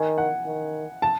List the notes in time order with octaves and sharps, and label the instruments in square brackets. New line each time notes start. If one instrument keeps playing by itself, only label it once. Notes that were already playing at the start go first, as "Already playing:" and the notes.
Already playing: [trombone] D#3 [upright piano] G#5
[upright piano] F#5
[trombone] D#3
[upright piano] A5